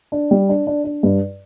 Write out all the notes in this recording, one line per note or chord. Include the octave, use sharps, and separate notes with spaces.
D4
G3
D4
D4
D4
G2